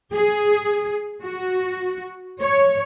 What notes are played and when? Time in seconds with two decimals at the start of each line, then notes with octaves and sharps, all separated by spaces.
0.13 G#4
1.23 F#4
2.40 C#5